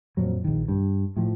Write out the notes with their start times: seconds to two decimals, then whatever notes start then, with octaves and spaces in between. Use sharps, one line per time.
0.17 F2 A#2 F#3
0.44 A#1 D#3
0.68 G2
1.17 A2 F3